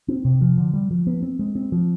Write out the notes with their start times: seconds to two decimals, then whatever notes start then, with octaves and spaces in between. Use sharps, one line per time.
0.08 C4
0.25 C3
0.41 F3
0.58 D3
0.74 G3
0.91 F3
1.07 B3
1.23 C4
1.39 G#3
1.55 C4
1.72 F3